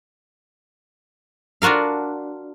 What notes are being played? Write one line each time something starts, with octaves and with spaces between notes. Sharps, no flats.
D4 F4 F#4 A#4 F5